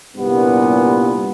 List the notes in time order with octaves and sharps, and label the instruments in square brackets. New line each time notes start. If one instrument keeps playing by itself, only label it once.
[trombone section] C2 G2 A#2 B3